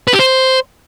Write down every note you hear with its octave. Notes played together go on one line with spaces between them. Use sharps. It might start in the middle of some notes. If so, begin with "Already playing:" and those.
B4
G4
C5